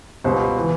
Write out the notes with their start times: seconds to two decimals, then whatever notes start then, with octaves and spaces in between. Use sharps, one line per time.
0.24 C#2 B2 G3 C5
0.58 E3